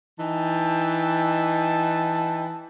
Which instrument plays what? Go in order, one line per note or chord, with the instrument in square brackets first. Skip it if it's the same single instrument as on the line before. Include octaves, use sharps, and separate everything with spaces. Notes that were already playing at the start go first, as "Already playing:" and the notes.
[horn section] E3 D#4 G5 A5